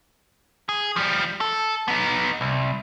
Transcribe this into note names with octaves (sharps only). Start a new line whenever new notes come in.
G#4
F3 G3
A4
B3 D#4
C2